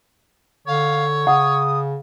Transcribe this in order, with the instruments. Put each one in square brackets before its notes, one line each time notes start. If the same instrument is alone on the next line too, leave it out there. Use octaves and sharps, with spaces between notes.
[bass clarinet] D3 [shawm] C#5 [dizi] F5
[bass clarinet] C#3 [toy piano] F#5 [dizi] D#6